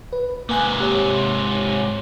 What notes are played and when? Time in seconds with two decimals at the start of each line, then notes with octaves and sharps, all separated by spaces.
0.13 B4
0.49 G#2 C3 A#3 G#5 F#6
0.80 G4 C#5